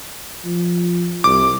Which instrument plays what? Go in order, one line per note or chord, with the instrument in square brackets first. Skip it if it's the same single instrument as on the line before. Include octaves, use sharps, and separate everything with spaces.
[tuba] F3
[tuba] C2 [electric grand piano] D6